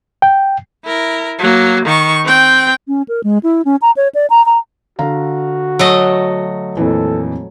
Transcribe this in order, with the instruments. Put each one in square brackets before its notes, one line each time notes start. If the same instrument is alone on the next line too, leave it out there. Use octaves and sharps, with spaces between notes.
[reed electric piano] G5
[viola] E4 A#4
F#3 A#3
D#3 C#6
C4 G5
[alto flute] C#4
A#4
G#3
E4
C#4
A#5
C#5
D5
A#5
A#5
[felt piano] D3 F5 A#5 [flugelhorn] F#4
[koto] F#3 A3 D#5
[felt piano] F2 A#2 E3 [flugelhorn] A4